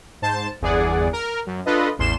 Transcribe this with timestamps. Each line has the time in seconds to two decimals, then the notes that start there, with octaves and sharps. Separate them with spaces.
0.22 G#2 C5 A5
0.61 G1 E2 G#4 D5 F#5
1.13 A#4
1.46 F#2
1.66 D4 F4 A4 B4 D#5
1.98 A1 E2 C6 E7